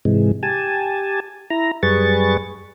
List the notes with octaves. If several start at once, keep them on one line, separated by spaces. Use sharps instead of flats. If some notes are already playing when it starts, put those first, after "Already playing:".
G#2 C3 E3 G#3
G4 G#5 A5
E4 A#5
F#2 G3 G#4 B4 C#6 A6